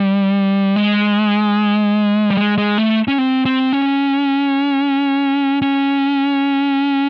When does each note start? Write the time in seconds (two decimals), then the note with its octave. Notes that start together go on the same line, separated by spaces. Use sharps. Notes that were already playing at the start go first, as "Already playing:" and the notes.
Already playing: G3
0.76 G#3
2.30 G3
2.37 G#3
2.58 G#3
2.78 A3
3.08 C#4
3.18 C4
3.45 C4
3.73 C#4
5.62 C#4